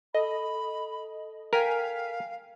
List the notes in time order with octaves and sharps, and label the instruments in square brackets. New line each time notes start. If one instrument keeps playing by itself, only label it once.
[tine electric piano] A4 [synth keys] D#5 [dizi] B5
[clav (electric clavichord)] A#4 [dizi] F5 [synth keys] G5 G#5 B6